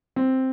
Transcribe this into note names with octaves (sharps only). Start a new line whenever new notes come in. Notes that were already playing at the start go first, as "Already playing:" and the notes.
C4